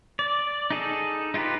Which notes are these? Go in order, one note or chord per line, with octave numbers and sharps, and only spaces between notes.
D5
D#4 G#4 A4
D#4 F4 G4 B4